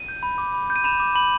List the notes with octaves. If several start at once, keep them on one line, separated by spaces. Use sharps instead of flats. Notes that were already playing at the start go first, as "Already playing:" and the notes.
Already playing: D#7
G6
B5
D6
B5
G6
D#7
B5 E7
D6
B5 F#7